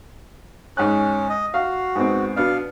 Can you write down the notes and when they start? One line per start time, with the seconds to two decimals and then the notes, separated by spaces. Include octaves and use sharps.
0.77 G#2 C#4 F#6
1.29 D#5
1.54 F#4 F5
1.96 G#2 B3 C4
2.36 B2 B3 D4 F5